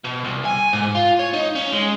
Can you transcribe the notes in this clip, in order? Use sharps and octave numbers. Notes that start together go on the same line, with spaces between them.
B2
C2
G#5
G#2
F4
C#5
D#4
C#4
G#3